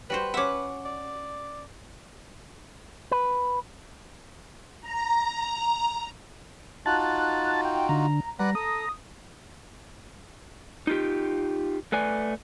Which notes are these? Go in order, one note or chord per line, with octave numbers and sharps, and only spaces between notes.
G3 F#4 B4 C5
C#4 E5 F#5 D6
D5
B4
A#5
D#4 F4 F#4 A5 F#6
G5
D3 A#5
G3 B4 D5 F#5 A#5
A4 D#6
D#4 F4 G4
A3 B4 D5 G#5